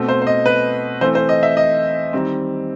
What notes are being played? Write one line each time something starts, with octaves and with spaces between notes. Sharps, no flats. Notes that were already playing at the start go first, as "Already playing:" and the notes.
Already playing: B2 A3 C4
C5
C5
D#5
B4
E3 A3 C4 C5
C5
D#5
E5
D#5
D#3 G3 C4